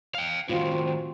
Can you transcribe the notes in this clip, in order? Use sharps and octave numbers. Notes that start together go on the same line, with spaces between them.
F5 G5
A2 D#3 C4 F4 F#4